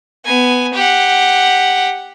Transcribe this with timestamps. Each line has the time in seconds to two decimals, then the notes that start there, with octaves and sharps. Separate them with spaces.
0.25 B3 G#5
0.74 G4 F#5